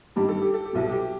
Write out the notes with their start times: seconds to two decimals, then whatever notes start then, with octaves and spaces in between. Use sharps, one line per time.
0.16 G2 D#3 G3 G4
0.29 A4
0.41 G4
0.54 A4
0.65 G4
0.73 C2 B2 F#3 A4
0.90 G4